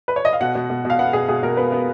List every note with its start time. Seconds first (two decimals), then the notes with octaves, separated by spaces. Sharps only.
0.08 B4
0.16 C#5
0.25 D#5
0.33 F5
0.40 B2 F#5
0.55 B2
0.70 B2
0.85 B2 F5
0.99 B3 F#5
1.13 B2 G#4
1.28 B2 G#4
1.43 B2 A#4
1.57 B3 B4
1.72 B3